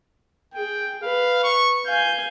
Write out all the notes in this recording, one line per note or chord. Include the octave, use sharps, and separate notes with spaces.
G#4 G5
B4 F5
C#6
F5 G#5 G6